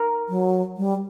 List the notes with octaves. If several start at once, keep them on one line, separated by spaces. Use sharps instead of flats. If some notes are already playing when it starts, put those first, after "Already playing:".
Already playing: A#4
F#3
G3